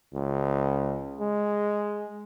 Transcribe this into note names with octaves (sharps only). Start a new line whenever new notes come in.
C#2
G#3